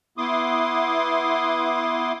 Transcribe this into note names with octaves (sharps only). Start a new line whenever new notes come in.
B3 E4 C6 D6 D#6